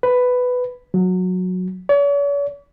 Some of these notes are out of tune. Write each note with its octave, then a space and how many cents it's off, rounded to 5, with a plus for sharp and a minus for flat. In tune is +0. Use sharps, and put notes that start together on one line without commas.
B4 +10
F#3 -15
C#5 +45